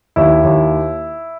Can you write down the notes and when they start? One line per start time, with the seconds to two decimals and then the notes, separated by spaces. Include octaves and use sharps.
0.16 D#2 E4
0.44 D#2